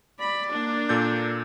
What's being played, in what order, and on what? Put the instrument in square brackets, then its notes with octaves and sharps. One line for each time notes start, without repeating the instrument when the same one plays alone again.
[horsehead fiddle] D5 [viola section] B5
[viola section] A#3 D4
[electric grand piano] A#2 A4 G6